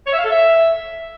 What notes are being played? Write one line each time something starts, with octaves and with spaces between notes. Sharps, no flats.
C#5
E5
F5
A4
E5